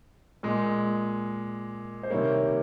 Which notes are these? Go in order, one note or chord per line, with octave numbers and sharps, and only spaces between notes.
A#2 G#3
C5
C3 D#3 G3 A#3 C#5